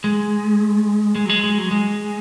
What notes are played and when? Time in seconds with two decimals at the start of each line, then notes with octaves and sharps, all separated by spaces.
0.04 G#3
1.15 G#3
1.26 F#3
1.29 G#3
1.44 G#3
1.58 F#3
1.71 G#3